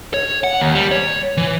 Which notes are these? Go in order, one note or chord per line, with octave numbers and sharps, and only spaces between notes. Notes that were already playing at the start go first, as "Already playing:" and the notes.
C#5
F#5
D#2
G3
C#5
E3